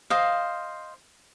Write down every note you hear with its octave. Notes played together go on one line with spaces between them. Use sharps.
C5 D#5 F5